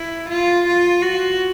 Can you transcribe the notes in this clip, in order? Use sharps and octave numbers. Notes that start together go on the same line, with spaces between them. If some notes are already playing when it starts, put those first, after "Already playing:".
Already playing: E4
F4
F4
F#4